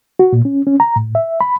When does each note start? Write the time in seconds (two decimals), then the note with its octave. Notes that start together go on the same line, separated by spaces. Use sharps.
0.19 F#4
0.33 A#2
0.45 C#4
0.67 C#4
0.80 A#5
0.96 A2
1.15 E5
1.41 B5